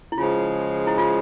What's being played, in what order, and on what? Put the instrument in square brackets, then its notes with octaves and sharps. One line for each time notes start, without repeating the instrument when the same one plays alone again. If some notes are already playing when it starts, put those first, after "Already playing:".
[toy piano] E4
[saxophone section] C#3 F3 G#3 [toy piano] F4
[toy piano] E4
F4